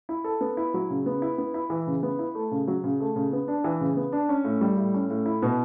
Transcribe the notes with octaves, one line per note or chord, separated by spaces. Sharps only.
E4
A4
B3
E4
F#3
C#3
B3
E4
B3
E4
E3
C#3
B3
E4
A3
C#3
F#3
C#3
A3
C#3
B3
D4
E3
C#3
B3
D4
C#4
A2
G3
A2
C#4
A2
E4
B2